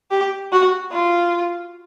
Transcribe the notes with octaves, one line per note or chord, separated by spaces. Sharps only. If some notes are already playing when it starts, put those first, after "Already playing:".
G4
F#4
F4